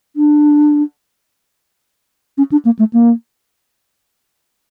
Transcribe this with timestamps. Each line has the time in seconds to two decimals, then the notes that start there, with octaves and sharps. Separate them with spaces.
0.16 D4
2.38 C#4
2.52 D4
2.65 A#3
2.79 A3
2.93 A#3